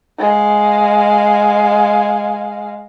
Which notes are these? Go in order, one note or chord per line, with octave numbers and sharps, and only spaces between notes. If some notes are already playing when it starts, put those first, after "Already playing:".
G#3 F5